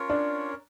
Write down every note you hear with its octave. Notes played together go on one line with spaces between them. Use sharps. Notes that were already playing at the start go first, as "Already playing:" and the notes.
Already playing: C#4 F4 A#4 C#5
D4